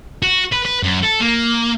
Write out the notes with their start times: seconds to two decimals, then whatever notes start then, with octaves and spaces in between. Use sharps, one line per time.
0.23 F#4
0.53 B4
0.66 B4
0.83 F#2
1.03 A4
1.21 A#3